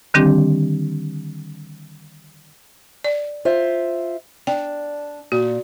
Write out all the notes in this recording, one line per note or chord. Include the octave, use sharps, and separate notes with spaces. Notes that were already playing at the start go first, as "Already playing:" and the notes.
D3 D#3 G3 C4 D4 G4
D5
F4 C5 E5
D4 G5
A#2 F#4